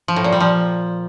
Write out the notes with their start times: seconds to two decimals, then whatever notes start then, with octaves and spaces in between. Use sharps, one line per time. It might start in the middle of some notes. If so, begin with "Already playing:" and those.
0.08 F3
0.16 A2
0.24 A#2
0.32 G3
0.40 F3